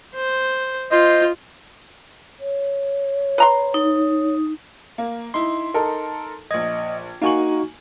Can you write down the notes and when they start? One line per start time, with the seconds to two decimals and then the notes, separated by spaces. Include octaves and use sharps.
0.15 C5
0.91 F4 C5 D#5
2.40 C#5
3.38 B4 A#5 C6
3.74 D#4
4.98 A#3
5.34 D#4 E4 C6
5.74 D#4 A4 A#4
6.51 A#1 D#5 G#6
7.22 A#3 D#4 F#4 G#5 C#6 F#7